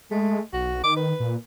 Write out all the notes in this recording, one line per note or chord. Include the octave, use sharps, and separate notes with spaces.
G#3 A3
B1 F#4
D#3 D6
B4
A#2